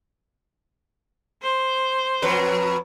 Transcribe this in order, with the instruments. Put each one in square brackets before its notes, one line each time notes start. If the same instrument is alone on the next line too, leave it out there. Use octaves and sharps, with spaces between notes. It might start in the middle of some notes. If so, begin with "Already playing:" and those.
[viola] C5
[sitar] F2 F#3 B4